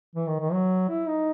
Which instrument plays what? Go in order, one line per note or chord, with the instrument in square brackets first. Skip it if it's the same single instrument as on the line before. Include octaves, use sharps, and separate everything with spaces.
[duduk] E3
D#3
D#3
F#3
E4
D#4